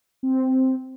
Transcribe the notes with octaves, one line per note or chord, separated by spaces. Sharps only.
C4